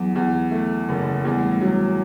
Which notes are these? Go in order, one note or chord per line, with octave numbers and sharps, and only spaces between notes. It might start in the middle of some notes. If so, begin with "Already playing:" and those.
Already playing: E2 F#3
E2
A3
F#1
E2 G3
A3
G3
F#3